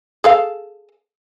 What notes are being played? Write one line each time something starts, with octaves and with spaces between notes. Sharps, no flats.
G#4 A4 F5